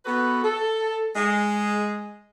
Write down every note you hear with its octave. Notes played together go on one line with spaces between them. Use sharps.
B3 F#4 A4 B4
A4
G#3 G#4